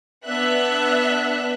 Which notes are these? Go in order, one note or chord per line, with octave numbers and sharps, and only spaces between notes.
B3 D4 E5 F#6